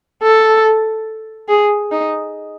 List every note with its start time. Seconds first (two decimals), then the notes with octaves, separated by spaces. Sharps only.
0.23 A4
1.49 G#4
1.92 D#4